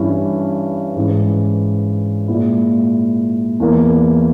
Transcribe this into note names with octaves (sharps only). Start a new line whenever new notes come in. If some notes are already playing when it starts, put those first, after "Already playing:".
Already playing: G2 E3 G3 C#4 E4
G#2 E3 G#3 C#4
A#2 G#3 E4
E2 E3 A#3